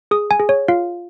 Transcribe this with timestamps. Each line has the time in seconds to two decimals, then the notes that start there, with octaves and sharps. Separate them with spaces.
0.11 G#4 D#6
0.31 G#5
0.40 G#4
0.49 C#5
0.68 F4 F5